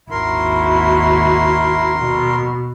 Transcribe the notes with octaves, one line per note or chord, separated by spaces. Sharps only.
G#1 D#2 E4 F#4 A#4 C6
B2